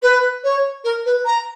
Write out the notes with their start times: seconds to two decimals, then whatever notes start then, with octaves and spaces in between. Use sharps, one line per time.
0.02 B4
0.43 C#5
0.84 A#4
1.05 B4
1.25 A#5